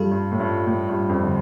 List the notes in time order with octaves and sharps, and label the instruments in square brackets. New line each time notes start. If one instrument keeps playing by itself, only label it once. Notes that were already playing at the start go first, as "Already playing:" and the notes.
Already playing: [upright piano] G2 [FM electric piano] G3 F4 A4
[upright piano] G2
A2
G2
A2
G2
F2
D3